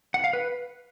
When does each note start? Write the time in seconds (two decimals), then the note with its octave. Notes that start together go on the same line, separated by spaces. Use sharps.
0.14 F#5
0.24 F5
0.33 B4